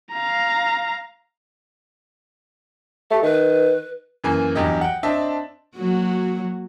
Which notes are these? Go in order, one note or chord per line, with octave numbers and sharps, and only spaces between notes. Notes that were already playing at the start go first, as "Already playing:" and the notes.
F5 A#5
A3 G4
D#3 B4
F#2 E3 A#3 G#5
E2 G2 F#3 G4 D#5
F#5 G5
C4 D4 D#5 E5 A5
F#3 A#3 F#4